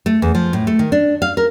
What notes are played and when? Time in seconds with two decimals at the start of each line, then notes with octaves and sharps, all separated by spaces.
0.06 A3
0.22 E2
0.35 F3
0.53 A2
0.67 A3
0.79 D#3
0.92 D4
1.22 F5
1.37 A#4